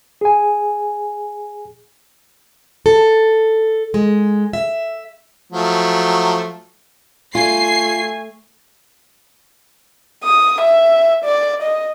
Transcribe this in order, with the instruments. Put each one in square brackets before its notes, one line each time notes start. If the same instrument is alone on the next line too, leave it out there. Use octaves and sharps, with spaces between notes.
[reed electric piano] G#4 G#5
[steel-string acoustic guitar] A4
G#3
E5
[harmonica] F3 F#3 A3
[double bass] A3 [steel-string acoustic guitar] F4 [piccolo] G#5 [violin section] C7
[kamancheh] D#6
E5
D5
D#5